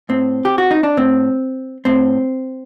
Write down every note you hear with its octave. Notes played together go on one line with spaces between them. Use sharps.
A2 C4
G4
F#4
D#4
D4
A2 C4
A2 C4